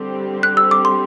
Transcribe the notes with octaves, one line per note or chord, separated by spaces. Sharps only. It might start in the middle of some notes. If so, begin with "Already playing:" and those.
Already playing: D3 G3 C4 G4
F#6
E6
D6
C6